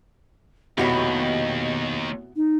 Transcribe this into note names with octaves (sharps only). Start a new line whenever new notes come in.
F1 D#2 B2 E4 F#4 G4 C#5 D#5
D#4